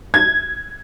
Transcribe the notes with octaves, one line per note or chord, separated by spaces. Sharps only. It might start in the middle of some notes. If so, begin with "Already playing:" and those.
G#6